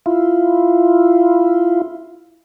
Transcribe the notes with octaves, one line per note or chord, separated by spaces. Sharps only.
E4 F4